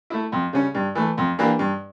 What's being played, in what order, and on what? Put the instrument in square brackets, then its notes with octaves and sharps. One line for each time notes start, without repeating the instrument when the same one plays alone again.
[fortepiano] A3 E4
F2
C#3 G3 C#4
G2
E3 A3
F2
E3 A#3 D4 G4
G2